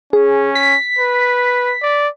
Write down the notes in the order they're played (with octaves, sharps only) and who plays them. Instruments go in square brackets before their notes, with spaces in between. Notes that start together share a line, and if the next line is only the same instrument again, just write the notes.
[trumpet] C#4 [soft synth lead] G#4
[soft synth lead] B6
[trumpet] B4
D5